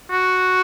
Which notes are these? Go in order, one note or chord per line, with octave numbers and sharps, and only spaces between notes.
F#4